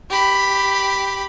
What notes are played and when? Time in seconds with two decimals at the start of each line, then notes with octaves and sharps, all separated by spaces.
0.10 G4 B5